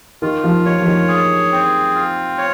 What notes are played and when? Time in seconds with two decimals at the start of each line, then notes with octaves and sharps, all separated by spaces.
0.22 D#3 F4
0.44 F3
0.65 D#3 C#5
0.80 F3
0.87 D#3
1.08 G#4
1.52 C4
1.95 F4
2.38 C#5